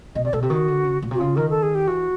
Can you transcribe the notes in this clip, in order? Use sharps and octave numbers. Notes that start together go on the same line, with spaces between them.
B2 D#5
C3 D5
B2 A4
C3 G4
D#3 F#4
D3
C#3
A#2
C3 F#4
C#3 F4
D#3 A#4
A4
G#4
G4
E3 F#4